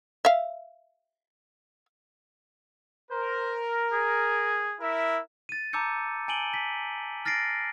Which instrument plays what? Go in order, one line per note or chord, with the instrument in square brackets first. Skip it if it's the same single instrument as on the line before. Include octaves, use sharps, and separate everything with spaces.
[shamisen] E5 F5
[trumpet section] A#4 [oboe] C5
[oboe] G#4
[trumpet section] E4 A#4 E5
[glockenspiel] A6 D#7
A5 A#5 D6 E6 G6 C#7
G#5 A5 D7 D#7 F#7 G7
B6
F6 A6 A#6 C7 D7